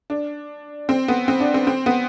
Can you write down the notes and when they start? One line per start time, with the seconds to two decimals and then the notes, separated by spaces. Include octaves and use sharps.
0.10 D4
0.89 C4
1.08 B3
1.28 C4
1.40 D4
1.54 C4
1.67 C4
1.86 B3